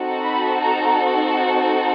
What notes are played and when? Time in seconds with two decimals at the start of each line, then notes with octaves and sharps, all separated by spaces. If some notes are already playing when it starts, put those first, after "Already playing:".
Already playing: C4 D#4 F#4 A4
0.23 B5
0.60 A#5